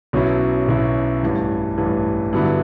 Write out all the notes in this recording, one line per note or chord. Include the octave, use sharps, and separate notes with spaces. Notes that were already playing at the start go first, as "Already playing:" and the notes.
B1 B2 F#3 C#4 E4
B1 B2 F#3 C#4 E4
A1 G2 E3
A1 G2 E3
G2 D3 F#3 B3 E4